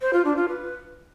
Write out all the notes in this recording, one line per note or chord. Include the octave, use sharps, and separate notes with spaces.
C5
F4
D4
F4
B4